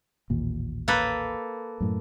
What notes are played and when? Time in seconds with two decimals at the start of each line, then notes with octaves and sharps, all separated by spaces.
0.30 A1 D#2 A#2
0.88 A#3 A4 B4
1.81 F#2 A2